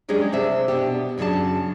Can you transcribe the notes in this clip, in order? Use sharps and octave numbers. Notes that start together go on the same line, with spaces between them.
F#3 G#3 C#4 D4 G4 G#4
C3 D4 E5
B2 D4 G4
F#2 C#3 F#3 D4 A5